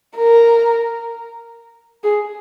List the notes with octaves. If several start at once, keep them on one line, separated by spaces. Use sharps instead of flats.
A#4
G#4